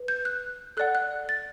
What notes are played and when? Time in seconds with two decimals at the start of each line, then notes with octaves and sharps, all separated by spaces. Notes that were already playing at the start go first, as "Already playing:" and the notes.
Already playing: B4
0.08 G6
0.25 F#6
0.77 A4 D5 F#5 F#6
0.95 F#6
1.29 A6